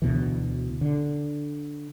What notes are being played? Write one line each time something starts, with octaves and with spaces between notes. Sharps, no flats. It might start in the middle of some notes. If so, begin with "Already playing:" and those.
D2 B2 E3
D3